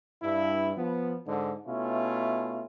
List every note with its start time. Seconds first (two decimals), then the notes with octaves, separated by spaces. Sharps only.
0.23 G2 E4
0.77 F3 B3
1.26 G#2 D3
1.67 B2 A3 C#4 E4 F4